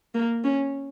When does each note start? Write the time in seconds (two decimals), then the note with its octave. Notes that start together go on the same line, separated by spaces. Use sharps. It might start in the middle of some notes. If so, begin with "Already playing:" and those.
0.14 A#3
0.44 C#4